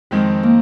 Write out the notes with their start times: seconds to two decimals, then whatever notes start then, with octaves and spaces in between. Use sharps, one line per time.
0.11 F2 D#3 G#3 C4 D#4
0.43 A#3